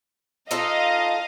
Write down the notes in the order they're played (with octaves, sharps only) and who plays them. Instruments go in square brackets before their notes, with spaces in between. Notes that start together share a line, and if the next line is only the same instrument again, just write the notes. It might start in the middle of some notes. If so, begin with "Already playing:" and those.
[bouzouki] D#4 F4 A4 [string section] D#5 F5